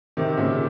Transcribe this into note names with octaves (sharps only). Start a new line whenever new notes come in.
C3 D#3
A#2 C#3